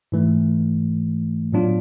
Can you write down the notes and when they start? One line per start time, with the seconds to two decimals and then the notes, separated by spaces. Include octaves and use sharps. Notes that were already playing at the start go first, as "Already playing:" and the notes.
0.12 G#2 E3 A3
1.53 A2 F#3 B3 D4 F4